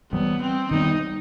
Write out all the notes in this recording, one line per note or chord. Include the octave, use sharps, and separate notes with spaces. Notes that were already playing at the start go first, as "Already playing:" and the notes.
E3 G3 B3 C4
C4
D#3 G3 B3 D#4